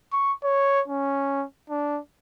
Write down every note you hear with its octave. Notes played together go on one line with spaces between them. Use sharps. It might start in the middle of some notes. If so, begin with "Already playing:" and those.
C#6
C#5
C#4
D4